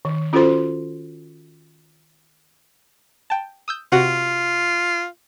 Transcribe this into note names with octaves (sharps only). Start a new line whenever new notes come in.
D#3
C#4 F4 F#4 A4 C5 C6
G5 A5
D#6 E6 G6
C3 F4 F#4 F#5